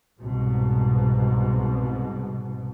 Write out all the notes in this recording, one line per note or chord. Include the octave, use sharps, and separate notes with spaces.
C2 G#2 B2